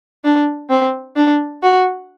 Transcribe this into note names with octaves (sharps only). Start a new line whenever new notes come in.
D4
C4
D4
F#4